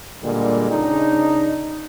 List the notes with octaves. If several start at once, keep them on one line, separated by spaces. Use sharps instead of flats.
A#2 D3 G3 G#3
C#3 D4 D#4